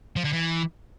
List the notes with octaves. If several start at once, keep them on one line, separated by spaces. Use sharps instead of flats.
F3
D3
E3